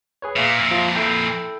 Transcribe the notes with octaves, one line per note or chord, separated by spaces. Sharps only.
G#4 B4 C#5
A#2 E5 F5 D6
F2 A#2 E5
F3 F4
E4 A4 G5